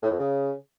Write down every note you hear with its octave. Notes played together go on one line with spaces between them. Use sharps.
A2
F2
C#3